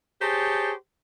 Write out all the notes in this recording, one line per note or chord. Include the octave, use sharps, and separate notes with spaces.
G4 G#4 C5 C#5 A5